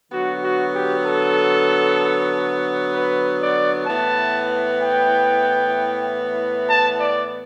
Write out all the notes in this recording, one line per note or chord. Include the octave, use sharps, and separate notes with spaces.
D3 F#3 B3 F#4
F#4
G4
A4
B4
D5
A2 E3 B3 A5
G5
A5
D5